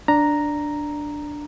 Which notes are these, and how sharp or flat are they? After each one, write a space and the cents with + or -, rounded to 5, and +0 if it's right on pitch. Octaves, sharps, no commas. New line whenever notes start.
D4 +0 A#5 +0